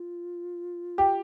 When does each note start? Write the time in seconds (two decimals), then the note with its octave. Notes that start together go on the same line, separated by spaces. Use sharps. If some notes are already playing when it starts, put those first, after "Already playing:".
Already playing: F4
0.98 G4